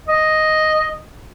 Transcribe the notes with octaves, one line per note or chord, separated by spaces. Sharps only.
D#5